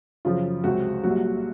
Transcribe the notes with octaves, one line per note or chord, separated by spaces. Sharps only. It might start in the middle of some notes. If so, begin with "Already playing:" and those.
F#2 C#3 F3 F4
C#2 C3 F#3 C4 F#4
C2 A#2 F#3 F#4